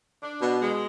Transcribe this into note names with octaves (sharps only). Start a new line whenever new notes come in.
D4
B2
G#3